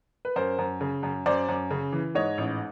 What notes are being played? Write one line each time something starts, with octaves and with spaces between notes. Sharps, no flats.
B4
F#2 A#4 C5
F#2
C#3
F#2
F#2 C5 D5
F#2
C#3
E3
G#2 C#5 D#5
A1